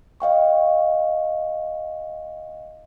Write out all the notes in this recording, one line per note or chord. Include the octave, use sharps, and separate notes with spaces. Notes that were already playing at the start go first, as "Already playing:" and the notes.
D#5 F5 G5 C#6